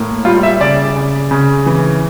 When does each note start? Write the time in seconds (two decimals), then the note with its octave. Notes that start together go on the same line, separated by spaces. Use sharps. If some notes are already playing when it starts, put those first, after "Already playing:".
Already playing: A2 A#3
0.25 G3 F4
0.43 E5
0.60 C#3 D5
0.96 C#3
1.31 C#3
1.66 E3